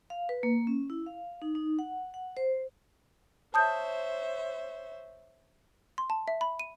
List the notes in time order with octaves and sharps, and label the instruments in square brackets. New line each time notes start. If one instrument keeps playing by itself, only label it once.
[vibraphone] F5
B4
A#3
C#4
E4
F5
D#4
D#4
F#5
F#5
C5
[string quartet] C5 C#5 E5 [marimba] A5 D#6 G6
[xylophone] C6
A5
E5
B5
D#7